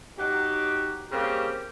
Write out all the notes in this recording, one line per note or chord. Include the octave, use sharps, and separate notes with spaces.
F#3 D#4 F#4 G4
C#3 G3 A#3 C4 G4